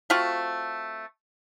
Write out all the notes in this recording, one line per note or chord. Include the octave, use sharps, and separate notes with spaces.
A3 C4 F4 F#4